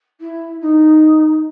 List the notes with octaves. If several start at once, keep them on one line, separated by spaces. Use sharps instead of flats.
E4
D#4